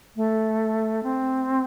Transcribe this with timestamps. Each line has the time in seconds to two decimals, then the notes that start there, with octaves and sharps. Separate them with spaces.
0.16 A3
1.03 C4